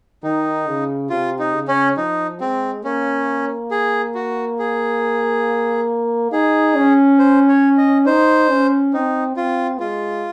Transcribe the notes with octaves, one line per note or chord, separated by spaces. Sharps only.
D#3 D#4
C#3
C3 F4
D#4
C#3
C#4
F3 D#4
G#3 C4
A#3 C#4
G#4
F#4
G#4
D#4 G#4
C#4
C5
C#5
D#5
D#4 C5
C#4
C4 D#4
C4 F4
G#3 F4